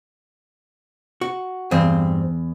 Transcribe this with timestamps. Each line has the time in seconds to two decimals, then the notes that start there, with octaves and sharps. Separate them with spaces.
1.21 F#4
1.71 E2 G2 C4